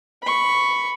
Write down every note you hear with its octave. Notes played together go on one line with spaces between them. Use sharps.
B5 C#6